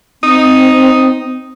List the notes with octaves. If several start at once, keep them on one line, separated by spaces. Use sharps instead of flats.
C4 D#4